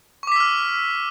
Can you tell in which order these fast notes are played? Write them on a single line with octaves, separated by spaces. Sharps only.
C#6 D6 B6 E6 F6